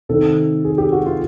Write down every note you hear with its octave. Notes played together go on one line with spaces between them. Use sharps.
C3 D#3 A4
G#4
G4
F#4
F4